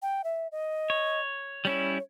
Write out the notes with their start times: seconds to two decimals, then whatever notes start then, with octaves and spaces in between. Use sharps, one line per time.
0.02 G5
0.24 E5
0.52 D#5
0.90 C#5
1.65 G3 C#4 E4 C#5